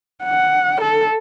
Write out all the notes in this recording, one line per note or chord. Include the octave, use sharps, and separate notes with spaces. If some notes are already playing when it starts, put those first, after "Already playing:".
F#5
A4